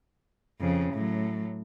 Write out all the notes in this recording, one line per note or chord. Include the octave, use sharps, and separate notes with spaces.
F2 C#3
A2 F#3